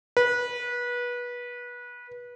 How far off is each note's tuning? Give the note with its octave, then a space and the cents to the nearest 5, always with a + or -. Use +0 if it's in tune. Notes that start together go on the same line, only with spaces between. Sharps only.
B4 -25